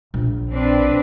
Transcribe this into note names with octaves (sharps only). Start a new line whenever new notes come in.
A#1
C4 D4 B4